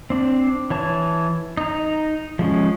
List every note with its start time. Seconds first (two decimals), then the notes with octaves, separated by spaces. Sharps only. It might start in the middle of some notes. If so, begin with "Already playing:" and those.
0.10 C4 D4
0.70 E3 C#5 A5
1.57 D#4 A#5
2.39 F3 G#3 C#4